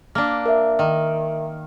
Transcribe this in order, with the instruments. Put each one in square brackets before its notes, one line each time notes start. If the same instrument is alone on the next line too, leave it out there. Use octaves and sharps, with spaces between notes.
[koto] A#3 D4
[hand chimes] A#4 E5
[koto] D#3